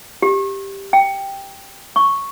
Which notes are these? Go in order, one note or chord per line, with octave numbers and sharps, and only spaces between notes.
G4
G5
C#6